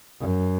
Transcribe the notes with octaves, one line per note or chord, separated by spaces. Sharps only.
F#2